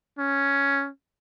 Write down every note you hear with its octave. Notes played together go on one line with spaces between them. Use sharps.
C#4